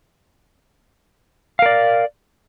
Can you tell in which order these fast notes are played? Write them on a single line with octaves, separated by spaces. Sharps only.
F5 A#4 D5